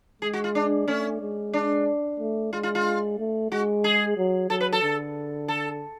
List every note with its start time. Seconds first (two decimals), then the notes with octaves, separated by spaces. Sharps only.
0.22 G#3 G#4
0.33 F#4
0.44 F4
0.55 D4
0.88 A3 C#4
1.21 G#3
1.54 D4
2.19 A3
2.53 G#3 F4
2.63 F4
2.75 F4
3.18 A3
3.51 G#3 F#4
3.84 G#4
4.17 F#3
4.49 F#3 A4
4.60 B4
4.73 A4
4.83 D3
5.48 A4